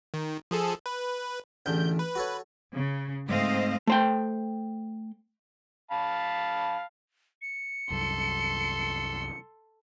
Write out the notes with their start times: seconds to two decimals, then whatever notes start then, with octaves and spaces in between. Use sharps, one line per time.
0.14 D#3
0.51 F3 G#4 A4
0.86 B4
1.66 A1 E2 D3 G6
1.99 B4
2.15 F#4 A4 C#5
2.74 C#3
3.29 G#2 A3 C4 C5 D#5 F5
3.87 A3 C5 G5
5.91 F5 A5 B5
7.42 C#7
7.90 C2 F#2 A4 C6